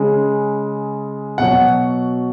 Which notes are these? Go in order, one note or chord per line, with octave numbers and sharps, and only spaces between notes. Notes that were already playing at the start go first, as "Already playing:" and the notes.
Already playing: C#3 G#3
B2 F#3 F#5